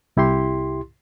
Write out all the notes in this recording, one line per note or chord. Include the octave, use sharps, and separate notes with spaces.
C2 E4 G4 C6